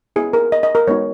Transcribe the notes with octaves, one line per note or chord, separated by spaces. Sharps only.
B3 E4 G#4
A#4
D#5
D#5
A#4
G#3 B3 D#4 F#4 C#5